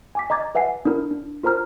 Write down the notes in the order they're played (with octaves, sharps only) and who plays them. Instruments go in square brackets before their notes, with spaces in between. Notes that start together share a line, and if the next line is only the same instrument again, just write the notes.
[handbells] G#5 D6 B6
D#5 A#5 D6 G#6 A6
B4 E5 F#5 G#5 C7
D4 E4 A#4
D4
F4 A#4 C5 A#5 F6